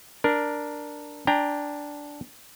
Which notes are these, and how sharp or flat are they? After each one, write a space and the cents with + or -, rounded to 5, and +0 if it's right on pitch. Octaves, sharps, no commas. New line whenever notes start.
D4 +0 A#4 +5
D4 -10 G5 +20 A#5 +0